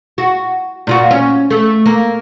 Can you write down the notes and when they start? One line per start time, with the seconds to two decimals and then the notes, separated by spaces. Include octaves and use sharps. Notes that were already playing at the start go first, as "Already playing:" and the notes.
0.18 F#4
0.87 A#2 F4 F#4
1.11 C#4
1.50 A3
1.86 A#3